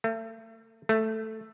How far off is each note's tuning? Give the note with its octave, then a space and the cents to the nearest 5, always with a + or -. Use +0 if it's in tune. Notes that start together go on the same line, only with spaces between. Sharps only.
A3 +35
A3 +0